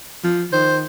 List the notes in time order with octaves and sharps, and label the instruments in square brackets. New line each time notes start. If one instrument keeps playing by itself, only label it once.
[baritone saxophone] F3
[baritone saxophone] D#3 [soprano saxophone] C5